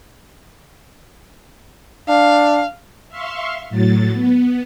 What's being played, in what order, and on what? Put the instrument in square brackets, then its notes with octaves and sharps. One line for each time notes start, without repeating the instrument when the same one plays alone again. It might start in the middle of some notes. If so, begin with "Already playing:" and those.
[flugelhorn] D4 [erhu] F5
[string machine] E5 F5 C6 C#6
A2 F#3 A6
B3